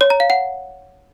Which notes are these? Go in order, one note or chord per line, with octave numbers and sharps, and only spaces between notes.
C#5
A#5
F5
F#5